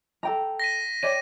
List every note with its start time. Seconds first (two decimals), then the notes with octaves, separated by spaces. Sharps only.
0.23 A4 G5 A#5
0.60 A#6 B6 D#7
1.03 C#5 D5 G5 D#7